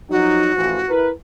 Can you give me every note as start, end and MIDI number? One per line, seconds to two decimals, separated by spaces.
0.11 0.52 53
0.11 0.52 54
0.11 0.52 63
0.11 0.91 66
0.56 0.81 33
0.56 0.81 52
0.56 0.81 53
0.90 1.11 64
0.90 1.11 70
0.90 1.11 71